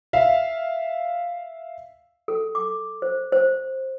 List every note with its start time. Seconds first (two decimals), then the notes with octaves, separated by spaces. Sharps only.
0.13 E5 F5
2.28 A4
2.55 D6
3.02 C5
3.32 C5